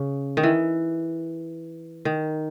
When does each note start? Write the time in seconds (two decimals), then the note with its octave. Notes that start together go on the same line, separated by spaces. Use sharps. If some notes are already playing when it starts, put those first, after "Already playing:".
Already playing: C#3
0.37 D#3
0.43 E3
2.05 D#3